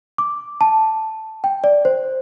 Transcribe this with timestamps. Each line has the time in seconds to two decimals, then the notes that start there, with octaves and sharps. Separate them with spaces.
0.18 D6
0.61 A5
1.44 G5
1.64 D5
1.85 C5